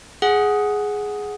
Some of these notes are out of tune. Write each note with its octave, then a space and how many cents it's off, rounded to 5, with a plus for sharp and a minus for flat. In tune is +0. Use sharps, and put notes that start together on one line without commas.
G#4 +5 F#5 +0